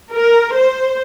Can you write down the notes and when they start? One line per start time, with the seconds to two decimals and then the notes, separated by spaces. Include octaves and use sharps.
0.13 A#4
0.56 C5